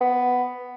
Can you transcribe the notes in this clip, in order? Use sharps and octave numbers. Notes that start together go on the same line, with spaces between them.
B3